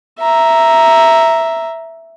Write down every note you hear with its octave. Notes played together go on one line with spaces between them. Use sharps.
E5 A#5